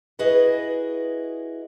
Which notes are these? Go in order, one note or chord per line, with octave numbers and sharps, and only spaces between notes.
E4 F#4 G#4 B4 D#5